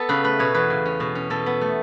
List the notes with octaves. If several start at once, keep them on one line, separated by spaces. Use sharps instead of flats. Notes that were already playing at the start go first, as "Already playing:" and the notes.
Already playing: B3 A4
C#3 B4
A3 B4
B2 C#5
E2 B4
C#3
C#4
B2
C#4
B2 A4
B3
A3